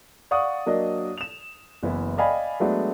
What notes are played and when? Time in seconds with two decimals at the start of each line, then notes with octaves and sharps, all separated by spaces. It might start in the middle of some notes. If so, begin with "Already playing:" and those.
0.31 D5 F5 F#5 C#6 D#6
0.66 F#3 A#3 D4 D#5
1.18 E7 F7
1.83 F#1 E3 B3 E4
2.18 D5 D#5 F5 G5 G#5 B5
2.60 F#3 G#3 A3 B3 D4 F#4